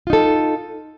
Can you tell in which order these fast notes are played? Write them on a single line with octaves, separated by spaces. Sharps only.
F4 D#4 A4